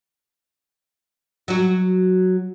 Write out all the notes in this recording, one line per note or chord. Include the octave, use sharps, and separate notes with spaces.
F#3 F#4